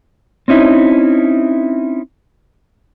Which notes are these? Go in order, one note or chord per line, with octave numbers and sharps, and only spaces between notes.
C4 C#4 D#4 E4